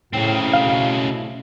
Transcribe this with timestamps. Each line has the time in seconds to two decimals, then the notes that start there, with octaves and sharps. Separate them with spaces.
0.13 A2 C#3 A3 C4 E4
0.54 B2 F5